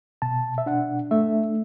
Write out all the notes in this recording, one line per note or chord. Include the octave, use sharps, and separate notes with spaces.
B2 A5
E5
D4 F#5
A3 E5